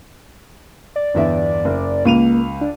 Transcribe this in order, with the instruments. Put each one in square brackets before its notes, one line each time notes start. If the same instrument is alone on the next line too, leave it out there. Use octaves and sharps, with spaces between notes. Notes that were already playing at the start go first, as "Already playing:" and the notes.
[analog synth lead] D5
[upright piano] G1 E2 E5
F#1
[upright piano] C#2 D#7 F7 [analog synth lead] A#3
[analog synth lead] D4